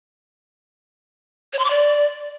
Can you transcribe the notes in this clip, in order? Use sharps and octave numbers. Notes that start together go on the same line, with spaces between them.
C#5
C6
D6
D5